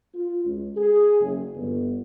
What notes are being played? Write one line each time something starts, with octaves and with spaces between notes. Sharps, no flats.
F4
C#2
G#4
F#1
G1